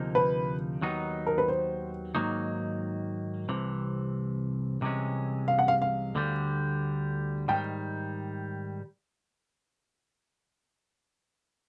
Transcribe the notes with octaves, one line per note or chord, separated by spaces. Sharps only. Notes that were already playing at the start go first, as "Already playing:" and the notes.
Already playing: D2 C3 F3 A#3 D#4
B4
D#2 D#3 F#3 B3 D#4
A#4
B4
C5
G#2 D#3 F#3 A#3 D#4
C2 C3 E3
C2 C3 E3 G#3 C#4
F5
F#5
F5
F5
D2 D3 G3
G#2 D#3 G3 G5